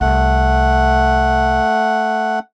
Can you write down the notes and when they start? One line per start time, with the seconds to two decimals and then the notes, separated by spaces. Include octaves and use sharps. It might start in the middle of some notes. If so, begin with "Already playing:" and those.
0.01 C2 A3 F#5